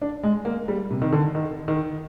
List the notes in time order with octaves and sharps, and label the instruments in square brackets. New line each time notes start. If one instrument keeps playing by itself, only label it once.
[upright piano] D4
G#3
A#3
G3
C3
D#3
D3
D#3
D#3